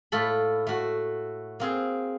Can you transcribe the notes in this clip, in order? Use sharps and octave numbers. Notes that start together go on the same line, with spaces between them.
A2 A3 F4 A4 B5
A3 F#4
A#3 C4 G#4